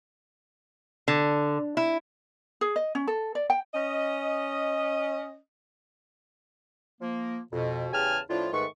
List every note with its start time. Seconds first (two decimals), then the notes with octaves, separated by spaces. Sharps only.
1.08 D3
1.77 E4
2.61 G#4
2.76 D#5
2.95 C#4
3.07 A4
3.35 D5
3.50 G5
3.74 C#4 D#5
7.01 F3 A#3
7.53 F2 B2
7.93 E2 C#3 G4 G#5 A5 F6
8.29 A2 F3 D4 E4 F4
8.53 G#2 D#3 A3 B4 C#6